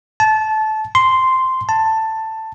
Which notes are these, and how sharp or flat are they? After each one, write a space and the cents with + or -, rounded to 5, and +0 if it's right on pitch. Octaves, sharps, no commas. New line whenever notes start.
A5 -20
C6 -5
A5 +10